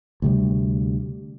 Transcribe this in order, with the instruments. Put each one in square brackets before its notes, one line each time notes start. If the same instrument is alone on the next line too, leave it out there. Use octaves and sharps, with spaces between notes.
[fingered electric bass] D2 C3 G3